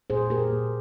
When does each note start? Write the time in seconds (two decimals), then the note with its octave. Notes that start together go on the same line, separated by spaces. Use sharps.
0.10 A#2 G#4 C5
0.30 A#3 G4 A#4
0.52 A#2